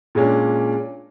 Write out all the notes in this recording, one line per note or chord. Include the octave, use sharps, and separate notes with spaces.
A#2 G#3 C#4 D4